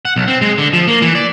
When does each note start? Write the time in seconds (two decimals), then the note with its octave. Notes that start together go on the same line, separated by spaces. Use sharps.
0.05 F#5
0.16 B1
0.28 C4
0.42 G#3
0.58 D3
0.73 F3
0.88 A#3
1.02 E3
1.15 D5